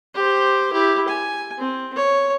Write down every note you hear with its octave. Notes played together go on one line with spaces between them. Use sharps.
G4 C5
E4 G4
G#5
C4
C#5